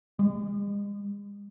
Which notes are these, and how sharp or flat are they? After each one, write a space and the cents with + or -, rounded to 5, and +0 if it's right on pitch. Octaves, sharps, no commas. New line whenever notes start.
G#3 -40